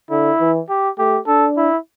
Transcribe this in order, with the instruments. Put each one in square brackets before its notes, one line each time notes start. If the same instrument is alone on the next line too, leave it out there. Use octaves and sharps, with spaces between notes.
[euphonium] D3 [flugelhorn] E4
[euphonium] E3
[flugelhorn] G4
[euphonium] A3 [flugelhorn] G4
[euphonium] D4 [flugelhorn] A4
[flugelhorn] E4